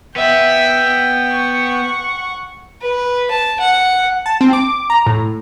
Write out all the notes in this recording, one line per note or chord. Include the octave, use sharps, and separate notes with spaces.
B3 E5 G5
F#5 C#6
B4
A5
F#5
A5
C4
D6
A#5
A2